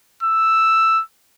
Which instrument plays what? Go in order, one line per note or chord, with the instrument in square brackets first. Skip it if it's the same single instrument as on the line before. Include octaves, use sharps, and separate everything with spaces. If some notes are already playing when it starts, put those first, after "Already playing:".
[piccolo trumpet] E6